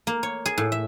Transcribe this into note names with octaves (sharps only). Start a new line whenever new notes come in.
A#3
C#5
G#4
A2
E5